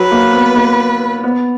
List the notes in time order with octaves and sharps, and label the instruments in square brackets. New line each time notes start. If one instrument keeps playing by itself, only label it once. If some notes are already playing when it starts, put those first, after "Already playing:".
Already playing: [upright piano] F#3 [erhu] B4
[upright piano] A#3
B3
A#3
B3